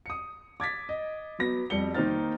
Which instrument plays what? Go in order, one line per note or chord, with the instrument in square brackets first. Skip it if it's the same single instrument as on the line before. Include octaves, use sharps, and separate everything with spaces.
[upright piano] D#6 C#7
D6 G#6 A6 B6
D#5
F#3 B3 A#6
F2 G3 C#7 G7
D#3 A#3 D#4 C5 F6 A6